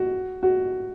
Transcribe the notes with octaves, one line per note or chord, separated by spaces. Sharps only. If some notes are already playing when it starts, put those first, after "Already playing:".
Already playing: F#4
F#4